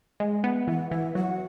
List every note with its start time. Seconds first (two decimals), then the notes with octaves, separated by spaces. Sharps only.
0.20 G#3 D#5
0.44 B3 E5
0.67 E3 F#5
0.91 E3 E5
1.15 F#3 F#5